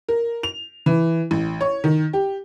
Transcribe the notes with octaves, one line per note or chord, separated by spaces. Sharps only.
A#4
F7
E3
A1
C#5
D#3
G4